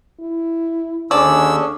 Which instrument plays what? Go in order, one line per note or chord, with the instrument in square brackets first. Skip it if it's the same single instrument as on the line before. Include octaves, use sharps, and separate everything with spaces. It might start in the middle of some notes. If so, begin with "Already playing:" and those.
[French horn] E4
[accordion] D#2 E6 [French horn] D3 [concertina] C#4 D4 G#4 [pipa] D5